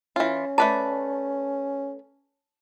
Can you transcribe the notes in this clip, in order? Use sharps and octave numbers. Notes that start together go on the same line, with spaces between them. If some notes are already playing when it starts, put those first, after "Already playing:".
E3 C#4 F4
A3 B4 D5 A5